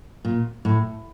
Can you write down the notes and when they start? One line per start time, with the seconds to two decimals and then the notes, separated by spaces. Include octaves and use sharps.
0.25 A#2
0.65 A2